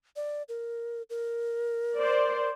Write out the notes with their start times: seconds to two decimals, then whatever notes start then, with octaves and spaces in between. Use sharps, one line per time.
0.16 D5
0.49 A#4
1.10 A#4
1.97 C5 D5